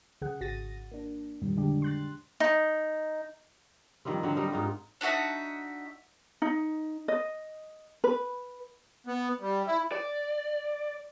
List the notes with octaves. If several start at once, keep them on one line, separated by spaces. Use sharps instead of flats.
C2 C#3 G#4 F#5
G#1 F#4 A6 A#6 D#7
A#3 D4
F2 A#2 D#3 G3
D3 G#3 D4 G4
C6 F#6 A6
D#4
D#3 F3 G3 C4
D3 F#3
G3 D#4 A#4
G#2 D#4 F4
D4 D#4 F#4 E5
D#4
D#5
B4
B3
G3
E4
D5